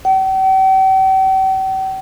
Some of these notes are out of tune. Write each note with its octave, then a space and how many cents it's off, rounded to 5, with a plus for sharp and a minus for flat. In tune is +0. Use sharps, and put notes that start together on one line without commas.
G5 -45